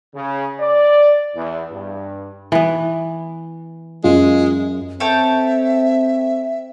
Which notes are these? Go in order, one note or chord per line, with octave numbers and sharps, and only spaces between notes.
C#3
D5
E2
G2
E3 B3
F#2 G#3 F4
C4 A4 C#5 E5 G5